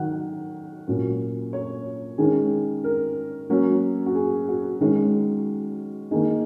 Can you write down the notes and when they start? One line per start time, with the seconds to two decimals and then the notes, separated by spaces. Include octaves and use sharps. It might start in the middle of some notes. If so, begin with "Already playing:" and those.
Already playing: D#3 F#3 F#5
0.87 A#2 F#3 C#4
1.53 C#5
2.18 D#3 G#3 C#4 G#4
2.84 A#4
3.49 F#3 A#3 C#4
4.06 F#4
4.15 G#4
4.48 F#4
4.81 D#3 G#3 C#4
6.11 D#3 A#3 D#4 G#4